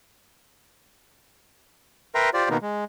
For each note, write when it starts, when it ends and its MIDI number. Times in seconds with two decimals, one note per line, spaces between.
2.15 2.30 70
2.15 2.30 71
2.15 2.30 76
2.15 2.30 79
2.15 2.30 82
2.15 2.30 84
2.34 2.49 65
2.34 2.49 67
2.34 2.49 72
2.34 2.49 74
2.50 2.57 47
2.50 2.57 51
2.50 2.57 58
2.50 2.57 59
2.50 2.57 63
2.62 2.84 56